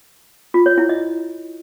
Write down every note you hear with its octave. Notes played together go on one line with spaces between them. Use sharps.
F4
C#5
E4
D#5